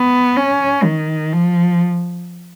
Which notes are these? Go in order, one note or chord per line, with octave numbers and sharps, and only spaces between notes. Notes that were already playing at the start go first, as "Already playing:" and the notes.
Already playing: B3
C#4
D#3
F3